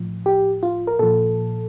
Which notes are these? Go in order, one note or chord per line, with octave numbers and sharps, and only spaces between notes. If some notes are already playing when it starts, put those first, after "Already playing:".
Already playing: A2 F3
G4
F4
A#4
A#2 F3 A4